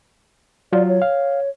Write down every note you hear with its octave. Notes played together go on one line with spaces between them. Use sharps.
F#3 F4 D5
C#5
F5